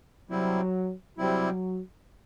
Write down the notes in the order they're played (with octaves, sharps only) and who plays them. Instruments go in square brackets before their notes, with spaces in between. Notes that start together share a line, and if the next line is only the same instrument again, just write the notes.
[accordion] C3 G3 C4 E4 [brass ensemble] F#3
[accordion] C3 G3 C4 E4 [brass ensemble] F#3